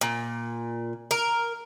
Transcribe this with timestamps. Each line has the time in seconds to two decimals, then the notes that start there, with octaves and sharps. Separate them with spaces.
0.01 A#2
1.11 A#4